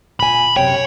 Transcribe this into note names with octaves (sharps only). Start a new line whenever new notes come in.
A#2 G#5 B5
F#2 C3 C#5 G5